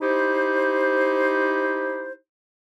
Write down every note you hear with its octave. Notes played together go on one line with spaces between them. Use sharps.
D#4 E4 G4 C5